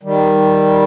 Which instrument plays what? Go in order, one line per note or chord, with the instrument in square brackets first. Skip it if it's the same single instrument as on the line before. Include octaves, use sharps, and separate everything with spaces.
[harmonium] D#3 G3